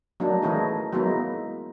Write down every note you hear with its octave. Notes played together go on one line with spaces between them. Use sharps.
F#3 A3 A#3 D4 D#4
E3 A3 C#4 D#4 E4 G#4
F#3 G#3 A#3 B3 D#4 E4